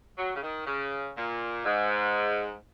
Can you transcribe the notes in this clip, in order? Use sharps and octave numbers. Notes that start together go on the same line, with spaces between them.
F#3
C#3
D#3
C#3
A#2
G#2